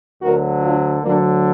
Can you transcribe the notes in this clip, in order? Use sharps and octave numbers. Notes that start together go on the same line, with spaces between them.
D2 D3 F#3 F#4 A#4
D4 F4
D2 D3 F#3 A#3 D4